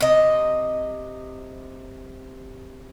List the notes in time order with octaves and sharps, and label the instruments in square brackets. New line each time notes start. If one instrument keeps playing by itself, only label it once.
[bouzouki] C3 D#5